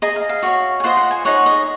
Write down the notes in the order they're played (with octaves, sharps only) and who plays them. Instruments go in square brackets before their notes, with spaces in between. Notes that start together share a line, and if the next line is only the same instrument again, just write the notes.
[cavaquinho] G#4 D#5 A#5
F5
F5
F#4 C#5 F5
G#5
F4 C5 D#5 F#5
F#5
G#5
D#4 G#4 C#5 F#5
D#5